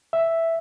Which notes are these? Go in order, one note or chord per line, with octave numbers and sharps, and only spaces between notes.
E5